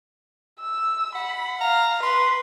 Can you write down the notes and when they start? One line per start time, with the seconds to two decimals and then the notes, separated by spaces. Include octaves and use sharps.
0.60 E6
1.15 F#5 B5
1.61 F5 A#5
2.03 B4 C6